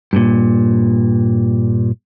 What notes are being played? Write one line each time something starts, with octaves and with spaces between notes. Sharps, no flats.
G2 A#2